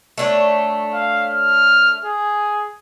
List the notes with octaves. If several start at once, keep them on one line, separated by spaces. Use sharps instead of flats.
A3 D4 C#5
F5
F6
G#4